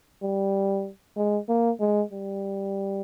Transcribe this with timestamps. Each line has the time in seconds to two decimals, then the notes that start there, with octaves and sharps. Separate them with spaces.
0.23 G3
1.16 G#3
1.49 A#3
1.80 G#3
2.12 G3